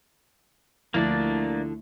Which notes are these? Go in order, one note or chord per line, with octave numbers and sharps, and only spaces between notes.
D2 D3 F3 A#3 D4 E4 D5